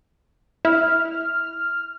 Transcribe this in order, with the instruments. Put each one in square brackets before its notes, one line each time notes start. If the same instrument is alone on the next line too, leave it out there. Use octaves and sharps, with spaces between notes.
[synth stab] E4 [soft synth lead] F6